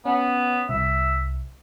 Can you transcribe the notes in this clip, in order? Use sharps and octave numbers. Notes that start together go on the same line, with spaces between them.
B3 C#4
C2 E5